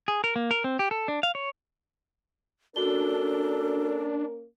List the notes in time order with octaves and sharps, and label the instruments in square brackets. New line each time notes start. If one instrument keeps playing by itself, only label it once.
[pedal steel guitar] G#4
A#4
A#3
A#4
C4
G4
A4
D4
F5
C#5
[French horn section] A#3 C#4 A#4 [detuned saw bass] D4 [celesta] F#4 G7 [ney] A4